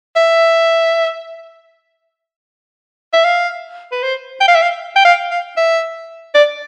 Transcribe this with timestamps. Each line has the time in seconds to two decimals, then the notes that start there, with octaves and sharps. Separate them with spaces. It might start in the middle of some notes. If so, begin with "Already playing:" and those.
0.16 E5
3.13 E5
3.25 F5
3.92 B4
4.03 C5
4.40 G5
4.48 F5
4.55 E5
4.62 F5
4.96 G5
5.05 F5
5.31 F5
5.57 E5
6.35 D5